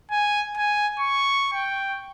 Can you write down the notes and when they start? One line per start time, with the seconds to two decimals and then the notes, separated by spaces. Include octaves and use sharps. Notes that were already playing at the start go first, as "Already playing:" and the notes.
0.11 G#5
0.57 G#5
0.99 C#6
1.54 G5